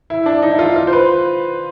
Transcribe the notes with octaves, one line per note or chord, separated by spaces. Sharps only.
E4
D4
D#4
E4
F4
F4
C5
B4